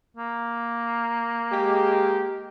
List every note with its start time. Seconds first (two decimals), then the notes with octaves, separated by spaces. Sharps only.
0.17 A#3
1.52 G#3 G4